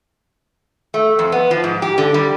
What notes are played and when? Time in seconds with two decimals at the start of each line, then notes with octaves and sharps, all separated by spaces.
0.94 A3
1.19 F2
1.32 B3
1.51 F3
1.64 G#2
1.82 G4
1.98 D3
2.14 G3